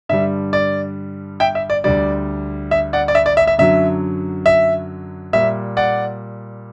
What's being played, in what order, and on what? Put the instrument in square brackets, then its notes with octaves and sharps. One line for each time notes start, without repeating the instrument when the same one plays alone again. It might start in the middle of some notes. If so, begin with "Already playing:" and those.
[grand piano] G2 D3 G3 E5
D5
E5 G5
E5
D5
D2 D3 G3 D5
E5
D5 F#5
D5
E5
D5
E5
E5
F#2 D3 F#3 E5
E5
A#2 G3 E5
D5 F#5